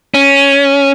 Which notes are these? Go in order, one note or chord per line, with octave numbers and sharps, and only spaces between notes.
C#4